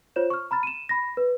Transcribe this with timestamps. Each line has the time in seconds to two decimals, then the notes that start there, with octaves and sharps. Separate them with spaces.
0.16 F4 C5 C#5 G6 E7
0.30 C#6 F6
0.51 A#5 B5 F6 A6
0.63 D#7 E7
0.89 B5 A#6
1.17 B4